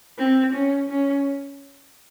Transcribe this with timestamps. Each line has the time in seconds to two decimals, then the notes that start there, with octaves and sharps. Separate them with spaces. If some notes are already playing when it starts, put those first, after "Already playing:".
0.19 C4
0.54 C#4
0.90 C#4